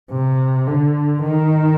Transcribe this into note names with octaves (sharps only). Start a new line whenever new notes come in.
C3
D3
D#3